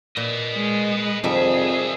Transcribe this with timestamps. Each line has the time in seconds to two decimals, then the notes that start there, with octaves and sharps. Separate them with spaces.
0.17 A#2 B4 D#5
0.54 G#3
1.24 C2 F2 C3 D#3 G3 G#4 E5